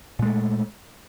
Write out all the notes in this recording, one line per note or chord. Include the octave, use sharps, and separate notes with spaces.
A#2 G#3 A3